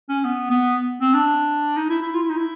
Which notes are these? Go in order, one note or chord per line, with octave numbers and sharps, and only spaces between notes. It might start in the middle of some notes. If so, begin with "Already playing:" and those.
C#4
B3
B3
C4
D4
D#4
E4
E4
F4
E4
D#4
E4